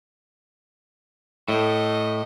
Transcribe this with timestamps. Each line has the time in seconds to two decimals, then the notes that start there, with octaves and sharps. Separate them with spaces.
1.48 A2 A3 D#5